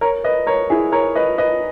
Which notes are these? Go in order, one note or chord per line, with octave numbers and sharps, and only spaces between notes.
A#4 C#5
B4 D#5
A#4 C#5
E4 G#4
A#4 C#5
B4 D#5
B4 D#5